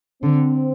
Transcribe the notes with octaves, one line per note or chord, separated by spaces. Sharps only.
D3 C4